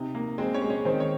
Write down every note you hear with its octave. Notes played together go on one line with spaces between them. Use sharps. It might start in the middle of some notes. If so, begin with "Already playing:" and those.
Already playing: C3 D#4
A#3
G#3 C4 C5
C#4 C#5
G#3
C#4 C#5
D#3 C4 C5
C#5